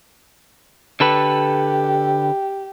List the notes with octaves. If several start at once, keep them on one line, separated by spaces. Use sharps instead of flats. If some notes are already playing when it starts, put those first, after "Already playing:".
D3 G4 A4 B4